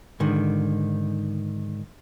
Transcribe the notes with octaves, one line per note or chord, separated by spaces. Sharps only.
G#2 D3 D#3